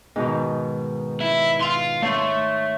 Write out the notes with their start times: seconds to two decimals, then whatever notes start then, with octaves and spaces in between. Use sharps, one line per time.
0.16 G#2 B2 D#3
1.21 E4
1.61 F5 C6
2.03 A3 C#5 C6